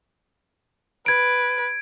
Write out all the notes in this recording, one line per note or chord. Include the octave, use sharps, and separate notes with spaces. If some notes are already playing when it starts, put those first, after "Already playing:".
B4 G#6 D7